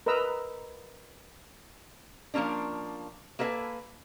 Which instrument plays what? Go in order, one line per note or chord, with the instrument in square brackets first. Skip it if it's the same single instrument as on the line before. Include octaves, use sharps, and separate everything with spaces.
[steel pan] A#4 B4 D#5 A#5 E6
[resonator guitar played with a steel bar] F3 F#3 A#3 C#4 D4
A#3 A4 B4 D#5 G#5